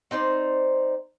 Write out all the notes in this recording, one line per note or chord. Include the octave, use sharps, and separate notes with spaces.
C4 D#4 C5 D5